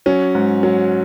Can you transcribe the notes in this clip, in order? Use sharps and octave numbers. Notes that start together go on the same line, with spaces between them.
F#3 C#4
G#2
F#3